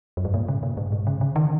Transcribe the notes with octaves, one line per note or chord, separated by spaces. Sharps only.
F#2
G#2
A#2
C#3
A#2
G#2
G#2
C#3
C#3
D#3